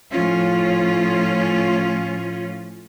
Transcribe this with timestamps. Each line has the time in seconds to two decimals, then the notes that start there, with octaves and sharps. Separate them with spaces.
0.11 A2 F3 C#4 F4